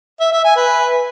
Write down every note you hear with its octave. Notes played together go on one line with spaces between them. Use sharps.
E5
E5
G#5
B4